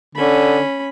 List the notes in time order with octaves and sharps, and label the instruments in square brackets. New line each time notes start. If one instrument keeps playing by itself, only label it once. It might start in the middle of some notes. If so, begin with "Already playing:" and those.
[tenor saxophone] D3 [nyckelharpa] C#4 B5